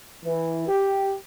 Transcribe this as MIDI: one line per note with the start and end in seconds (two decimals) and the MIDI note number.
0.25 0.67 52
0.68 1.15 67